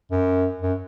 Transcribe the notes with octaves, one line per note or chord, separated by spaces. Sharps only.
F#2
F#2